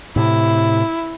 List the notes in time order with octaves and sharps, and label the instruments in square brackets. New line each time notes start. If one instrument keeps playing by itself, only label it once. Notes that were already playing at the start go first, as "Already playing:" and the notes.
[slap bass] A2 C3 [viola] E4